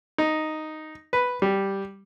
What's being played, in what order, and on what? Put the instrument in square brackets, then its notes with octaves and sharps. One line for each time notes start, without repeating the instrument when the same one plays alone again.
[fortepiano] D#4
B4
G3